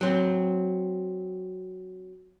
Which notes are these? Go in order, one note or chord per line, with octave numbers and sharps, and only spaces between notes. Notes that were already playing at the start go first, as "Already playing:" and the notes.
F#3 C4